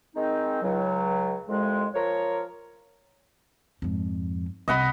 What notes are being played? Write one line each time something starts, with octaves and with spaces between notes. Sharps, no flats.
D#3 G#3 C4 D#4
C#2 F#3
C2 F2 G#3
F3 A#4 C#5
F2 G#2
C2 C3 D#5 F#5 B5